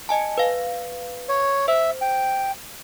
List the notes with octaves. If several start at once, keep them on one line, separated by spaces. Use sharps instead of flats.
D#5 G#5 A5
B4 F5
C#5
C5 E5
G5